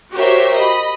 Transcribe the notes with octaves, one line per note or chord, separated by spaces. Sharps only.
F#4 G4 A#4 C5 C#5 E5
D#5 B5